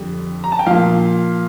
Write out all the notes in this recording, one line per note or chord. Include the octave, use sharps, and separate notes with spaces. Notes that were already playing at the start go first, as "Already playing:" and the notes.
Already playing: F2 D3 G3
A#5
A5
G5
A#2 F3 F5